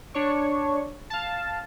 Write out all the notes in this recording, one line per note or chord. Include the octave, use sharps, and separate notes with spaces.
D4 C#5 C#6
F5 A5